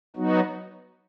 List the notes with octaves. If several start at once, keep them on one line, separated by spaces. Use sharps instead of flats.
F#3 B3 D#4 F#4